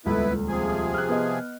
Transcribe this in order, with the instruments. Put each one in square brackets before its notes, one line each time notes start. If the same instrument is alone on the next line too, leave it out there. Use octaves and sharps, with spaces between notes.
[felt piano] D#1 C#2 A4 [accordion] B3 E4 B4
[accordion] C3 F3 G#4
[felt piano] F6 F#6
B3 D#5